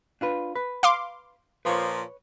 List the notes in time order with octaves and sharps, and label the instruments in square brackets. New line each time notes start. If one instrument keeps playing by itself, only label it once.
[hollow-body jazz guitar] D4 F4 B4
B4
[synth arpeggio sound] F5 C6 D6
[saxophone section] A#2 F3 [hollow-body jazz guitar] B4 C#5